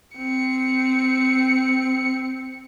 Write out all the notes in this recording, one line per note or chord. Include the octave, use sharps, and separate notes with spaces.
C4 C#7